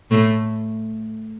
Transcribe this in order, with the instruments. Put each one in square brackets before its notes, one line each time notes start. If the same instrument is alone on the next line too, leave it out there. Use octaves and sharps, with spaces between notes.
[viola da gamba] A2 A3